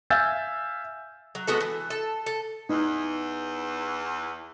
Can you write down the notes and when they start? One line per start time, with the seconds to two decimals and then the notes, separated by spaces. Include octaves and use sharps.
0.10 E5 F5 G#5 E6 G6 A6
1.35 F#3
1.47 G#3 B3 F#4 A4
1.61 E3
1.90 A4
2.26 A4
2.69 E2 D#4